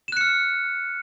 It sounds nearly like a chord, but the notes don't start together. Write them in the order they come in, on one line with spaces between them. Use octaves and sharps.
E7 F#6 C#7 F6